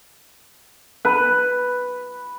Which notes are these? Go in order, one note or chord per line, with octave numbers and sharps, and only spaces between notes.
B4